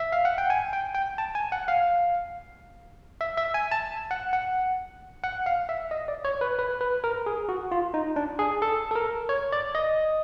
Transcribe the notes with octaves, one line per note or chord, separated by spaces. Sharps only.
E5
F5
F#5
G5
G#5
G5
G5
A5
G#5
F#5
F5
E5
E5
G#5
A5
F#5
F#5
F#5
F5
E5
D#5
D5
C#5
B4
B4
B4
A#4
G#4
F#4
F4
D#4
D4
G#4
A4
A4
A#4
C#5
D5
D#5